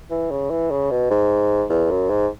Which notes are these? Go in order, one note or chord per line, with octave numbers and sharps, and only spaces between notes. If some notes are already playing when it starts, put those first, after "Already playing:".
E3
C#3
E3
C#3
B2
G#2
E2
F#2
G#2